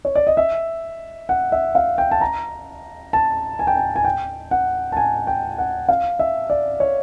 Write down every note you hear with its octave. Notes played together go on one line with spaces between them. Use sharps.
C#5
D5
D#5
E5
F#5
E5
F5
G5
A5
A#5
A5
G#5
G5
G#5
G#5
G5
F#5
A5
G#5
G5
F#5
F5
E5
D5
C#5